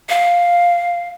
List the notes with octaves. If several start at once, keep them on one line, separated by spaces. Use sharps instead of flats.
F5